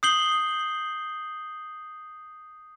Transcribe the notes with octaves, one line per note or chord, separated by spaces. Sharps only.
D#6 G6 C7 F#7 G7